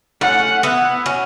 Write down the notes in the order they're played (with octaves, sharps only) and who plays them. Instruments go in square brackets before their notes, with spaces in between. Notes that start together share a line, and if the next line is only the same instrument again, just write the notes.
[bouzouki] A3 C#4 [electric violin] F#5
[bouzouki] B3 E4
C#4 F#4